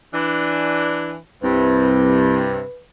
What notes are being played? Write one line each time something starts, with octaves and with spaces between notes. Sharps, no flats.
E3 D4
C2 G2 C3 B4